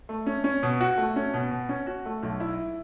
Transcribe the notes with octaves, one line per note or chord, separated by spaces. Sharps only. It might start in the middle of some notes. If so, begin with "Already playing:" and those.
A3
C#4
C#4
B2
F#4
A3
C#4
B2
B2
C#4
F#4
A3
B1
E4